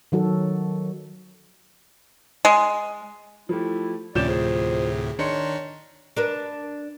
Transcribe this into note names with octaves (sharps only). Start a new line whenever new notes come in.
D#3 F#3 F#4 A4
G#3
F3 A3 E4 G4
D2 A2 C3 F3 C#4 D5 G6 E7
G#4 C5
D#3 D4 D#4 C#5 C6 C#7
D4 A#4 B4